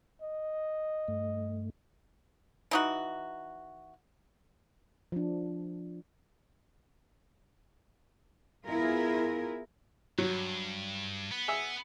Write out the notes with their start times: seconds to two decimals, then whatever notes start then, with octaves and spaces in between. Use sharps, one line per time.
0.22 D#5
1.08 G2 A3
2.71 E3 D#4 F#4
5.12 F3 D4
8.66 B3 E4 F4 G#4 A#4
10.18 G2 F#3
11.31 B3
11.48 G#4 E5